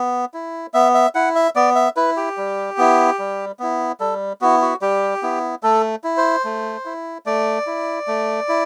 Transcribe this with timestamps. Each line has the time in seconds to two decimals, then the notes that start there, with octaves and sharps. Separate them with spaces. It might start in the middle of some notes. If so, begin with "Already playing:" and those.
Already playing: B3
0.34 E4
0.74 B3 E5
0.94 E5
1.15 E4 F#5
1.36 E5
1.56 B3 D5
1.75 E5
1.96 E4 B4
2.17 G4
2.37 G3
2.78 B3 E4
3.19 G3
3.59 B3 E4
4.00 G3 A4
4.41 B3 E4 F#4
4.62 F#4
4.82 G3 G4
5.23 B3 E4
5.63 A3 A4
6.04 E4
6.17 C5
6.45 A3
6.85 E4
7.26 A3 D5
7.67 E4
8.08 A3
8.49 E4